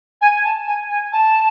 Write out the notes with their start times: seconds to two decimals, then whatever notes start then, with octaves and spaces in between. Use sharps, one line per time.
0.21 G#5
0.44 A5
0.67 G#5
0.90 G#5
1.13 A5